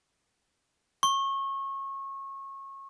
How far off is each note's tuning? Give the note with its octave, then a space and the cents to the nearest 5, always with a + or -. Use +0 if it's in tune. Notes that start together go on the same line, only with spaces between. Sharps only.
C#6 -25